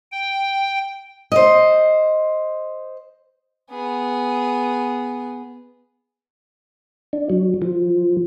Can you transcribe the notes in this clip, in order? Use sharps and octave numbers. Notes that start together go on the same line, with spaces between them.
G5
C5 D#5
B3 G#4
D4
F#3
F3